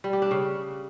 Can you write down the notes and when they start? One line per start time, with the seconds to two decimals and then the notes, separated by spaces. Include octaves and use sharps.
0.04 G3
0.13 G4
0.22 D4
0.31 C#3